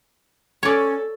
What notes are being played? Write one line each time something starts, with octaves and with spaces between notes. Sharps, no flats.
C#4 A4 C#5 D5